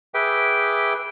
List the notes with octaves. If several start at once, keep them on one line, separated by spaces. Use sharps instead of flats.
G#4 B4 E5 G5 D6